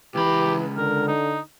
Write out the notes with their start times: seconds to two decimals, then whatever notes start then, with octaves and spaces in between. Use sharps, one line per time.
0.15 C#2 E3 G4 B5
0.77 D3 A#4
1.07 D#4